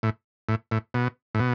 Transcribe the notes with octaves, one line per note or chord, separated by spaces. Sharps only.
A2
A2
A2
B2
A2
B2